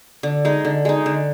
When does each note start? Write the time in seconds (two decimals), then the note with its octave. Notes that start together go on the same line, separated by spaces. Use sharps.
0.23 D3
0.45 G#3 D#4
0.65 D3
0.85 G#3 D#4
1.06 D3